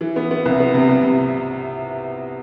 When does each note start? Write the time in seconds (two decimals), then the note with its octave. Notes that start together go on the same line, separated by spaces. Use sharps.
0.01 E3
0.16 B3
0.31 B3
0.46 C2
0.60 B3
0.74 C3
0.89 C2
1.03 C3